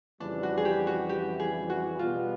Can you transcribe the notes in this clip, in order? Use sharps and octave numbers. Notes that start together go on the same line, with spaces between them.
F2 C#3 E3 G3 D4
F#4
G#4
G4
F#4
G4
G#4
F#4
B2 G3 B3 F4